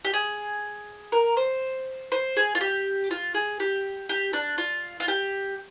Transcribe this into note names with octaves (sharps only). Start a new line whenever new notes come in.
G4
G#4
A#4
C5
C5
G#4
F4
G4
F4
G#4
G4
G4
D4
F4
F4
G4